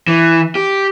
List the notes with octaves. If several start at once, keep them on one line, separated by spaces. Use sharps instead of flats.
E3
G4